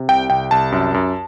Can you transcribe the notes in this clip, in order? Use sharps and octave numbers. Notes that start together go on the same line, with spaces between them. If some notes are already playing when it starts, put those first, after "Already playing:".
Already playing: C3
C2 G5
C2 G5
C2 A5
F#2
F#2